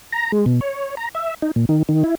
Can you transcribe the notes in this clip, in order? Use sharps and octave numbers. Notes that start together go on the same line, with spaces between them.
A#5
G#3
B2
C#5
A#5
E5
D#4
A#2
D#3
D#3
E4